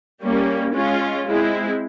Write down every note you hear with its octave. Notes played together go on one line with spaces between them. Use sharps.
G3 A#3 C#4
G#3 C#4 F4
G#3 C4 E4